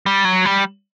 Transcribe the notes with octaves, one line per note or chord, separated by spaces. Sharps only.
G3
F#3
G3